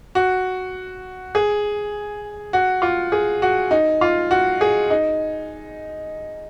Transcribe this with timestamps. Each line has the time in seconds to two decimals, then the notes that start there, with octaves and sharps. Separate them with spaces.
0.15 F#4
1.35 G#4
2.53 F#4
2.82 F4
3.12 G#4
3.42 F#4
3.71 D#4
4.01 F4
4.31 F#4
4.61 G#4
4.90 D#4